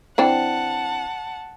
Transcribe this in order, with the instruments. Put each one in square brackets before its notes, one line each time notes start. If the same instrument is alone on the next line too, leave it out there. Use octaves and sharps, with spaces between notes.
[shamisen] E3 C4 D4 [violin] F#5 A5